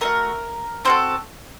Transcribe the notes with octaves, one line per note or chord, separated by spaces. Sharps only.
A3 D#4 F#4 A#4
C4 F#4 A4 C5